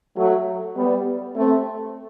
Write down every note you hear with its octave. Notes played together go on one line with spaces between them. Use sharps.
F#3 A3
G3 B3
A3 C4